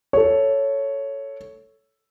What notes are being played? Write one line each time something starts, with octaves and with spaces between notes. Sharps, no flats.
A4 C#5